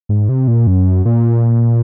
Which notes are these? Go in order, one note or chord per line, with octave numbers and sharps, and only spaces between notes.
G#2
C3
A#2
F#2
A#2